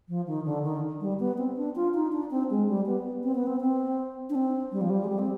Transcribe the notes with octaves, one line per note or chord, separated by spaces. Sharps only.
F3
D#3
D3
D#3
G3
B3
C4
D4
F4
D#4
D4
C4
G#3
G3
B3
C4
B3
C4
C4
D4
C4
G3
F3
G3
G#3
G3
C4